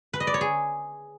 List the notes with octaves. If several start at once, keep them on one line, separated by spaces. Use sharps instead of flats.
B4
D#5
D5
C#5
G#4